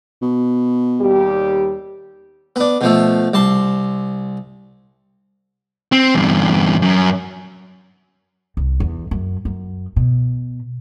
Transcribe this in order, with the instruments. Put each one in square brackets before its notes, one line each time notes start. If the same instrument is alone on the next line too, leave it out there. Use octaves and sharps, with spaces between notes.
[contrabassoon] B2
[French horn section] D#2 G3 G4
[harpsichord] B3 D4
B2 F3 A3
C2 A5 C6
[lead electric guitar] C4
E2 G2
F#2
[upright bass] C2
E2
F#2
F#2
B2